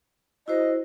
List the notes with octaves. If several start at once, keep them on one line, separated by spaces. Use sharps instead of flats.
E4 F#4 C5 D#5